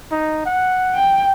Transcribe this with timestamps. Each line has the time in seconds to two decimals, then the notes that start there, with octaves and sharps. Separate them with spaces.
0.11 D#4
0.46 F#5
0.94 G5